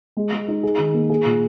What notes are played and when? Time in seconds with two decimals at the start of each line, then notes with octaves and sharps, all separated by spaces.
0.17 G#3
0.32 G#3
0.48 D#4
0.63 G#4
0.78 D#3
0.94 A#3
1.10 G#4
1.25 A#2